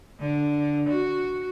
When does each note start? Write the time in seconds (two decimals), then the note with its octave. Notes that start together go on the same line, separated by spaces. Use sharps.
0.20 D3
0.89 F#4